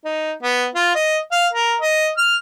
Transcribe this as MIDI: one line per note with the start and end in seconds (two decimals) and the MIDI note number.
0.05 0.32 63
0.43 0.66 59
0.75 0.95 65
0.95 1.18 75
1.32 1.47 77
1.53 1.75 70
1.81 2.10 75
2.18 2.36 89